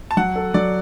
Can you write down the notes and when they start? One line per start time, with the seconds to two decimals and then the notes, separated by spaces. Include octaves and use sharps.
0.11 A5
0.17 F#3 F#5
0.36 A4
0.54 F#3 D5